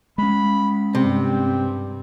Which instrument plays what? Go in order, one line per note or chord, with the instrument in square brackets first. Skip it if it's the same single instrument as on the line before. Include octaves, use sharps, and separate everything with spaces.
[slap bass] G#3 C#4 [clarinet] B5
[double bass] G2 G3 [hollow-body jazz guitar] C3 [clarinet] C4